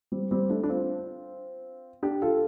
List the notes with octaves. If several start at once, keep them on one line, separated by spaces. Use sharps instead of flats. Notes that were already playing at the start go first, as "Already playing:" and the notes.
G3 C4
G3 C4
A3 D4
D4
C4 F4
D4 G4
F4 A4